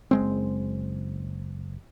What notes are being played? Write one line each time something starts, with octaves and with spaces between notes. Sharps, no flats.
F#1 G#3 C4